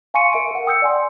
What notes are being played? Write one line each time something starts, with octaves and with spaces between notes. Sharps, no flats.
F5 G#5 C6 C#6 C#7 D#7
A#4 E5 C#7 D7
A#4 F#5
G5 D#6 E6 G6 C#7
D5 F#5 G#5 C6